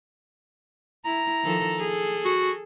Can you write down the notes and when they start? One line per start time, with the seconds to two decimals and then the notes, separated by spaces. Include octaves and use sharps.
1.05 E4 A#5
1.44 D#3 F3 A4
1.79 G#4 A4
2.25 F#4